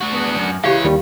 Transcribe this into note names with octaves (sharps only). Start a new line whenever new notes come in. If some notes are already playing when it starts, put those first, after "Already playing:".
D4 F#4
E2 B3
F#2
E3 G#3 G4 C#5 F5
D#2 D#3 G3